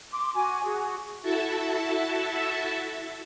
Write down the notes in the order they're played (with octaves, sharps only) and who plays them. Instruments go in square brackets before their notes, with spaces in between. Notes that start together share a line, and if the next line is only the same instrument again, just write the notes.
[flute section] C6 D6
F#4 G#5 D6
F#4 G#4
[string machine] E4 F#4 A4 E5 A5